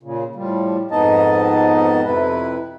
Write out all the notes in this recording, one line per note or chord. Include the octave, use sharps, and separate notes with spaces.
A#2 C#3
A2 F3 G3
F2 G#2 B3 D#4 D#5 A5
F2 C3 E4 B4